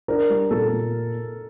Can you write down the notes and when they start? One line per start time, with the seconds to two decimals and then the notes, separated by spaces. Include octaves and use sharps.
0.08 D4 A#4
0.30 G3
0.51 A#2 A4
0.72 A#2